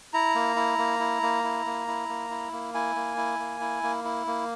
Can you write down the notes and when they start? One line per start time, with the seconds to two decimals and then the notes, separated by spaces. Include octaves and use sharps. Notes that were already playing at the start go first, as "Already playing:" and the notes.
0.14 E4 A#5
0.35 A#3
0.56 E4
0.78 A#3
0.99 E4
1.22 A#3
1.44 E4
1.66 A#3
1.88 E4
2.09 A#3
2.30 E4
2.52 A#3
2.74 E4 G#5
2.96 A#3
3.17 E4
3.39 A#3
3.61 E4
3.83 A#3
4.04 E4
4.27 A#3